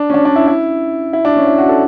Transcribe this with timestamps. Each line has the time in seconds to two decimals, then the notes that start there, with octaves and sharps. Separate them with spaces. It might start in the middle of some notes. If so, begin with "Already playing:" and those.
Already playing: D4
0.10 C#4
0.14 D4
0.25 D4
0.36 E4
0.48 E4
1.13 E4
1.25 D4
1.36 C#4
1.47 E4
1.58 F#4
1.69 A4